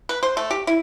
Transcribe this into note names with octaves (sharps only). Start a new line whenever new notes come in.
B4
C5
A3
G4
E4